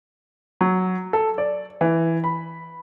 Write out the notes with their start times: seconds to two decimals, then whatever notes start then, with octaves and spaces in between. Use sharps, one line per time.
0.61 F#3
1.13 A4
1.38 D5
1.81 E3
2.24 B5